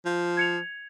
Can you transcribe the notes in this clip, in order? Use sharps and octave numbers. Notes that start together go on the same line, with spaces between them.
F3
G#6 C#7 F7